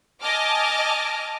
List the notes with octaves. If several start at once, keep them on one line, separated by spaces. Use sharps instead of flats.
D#5 G#5 A5 D6 F6